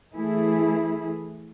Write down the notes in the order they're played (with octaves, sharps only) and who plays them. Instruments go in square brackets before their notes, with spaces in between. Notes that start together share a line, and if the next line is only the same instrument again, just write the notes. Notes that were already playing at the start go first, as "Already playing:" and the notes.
[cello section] E3 A3 E4 G#4